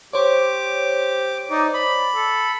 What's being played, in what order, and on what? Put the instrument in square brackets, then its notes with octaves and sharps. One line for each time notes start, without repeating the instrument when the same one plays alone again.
[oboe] G4 [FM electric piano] C5 C#5 [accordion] D6
[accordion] D#4 [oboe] D5
[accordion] B5
[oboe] A4